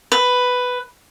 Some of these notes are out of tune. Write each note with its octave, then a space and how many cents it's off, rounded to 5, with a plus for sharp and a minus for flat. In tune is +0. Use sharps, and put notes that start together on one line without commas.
B4 +5